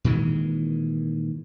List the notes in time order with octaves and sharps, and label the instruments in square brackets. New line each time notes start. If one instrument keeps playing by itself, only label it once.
[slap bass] A#2 D#3 E3 G#3